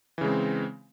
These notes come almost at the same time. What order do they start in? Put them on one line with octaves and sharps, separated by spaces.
E3 C#3 G#3 C4